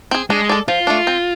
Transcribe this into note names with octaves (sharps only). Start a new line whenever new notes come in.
C4 G#4
G#3 D4
A4 D5
F3 F4
A3 D4
C4